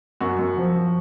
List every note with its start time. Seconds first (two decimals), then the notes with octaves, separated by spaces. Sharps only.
0.20 F#2 F#4
0.39 F#2
0.58 F3
0.76 F3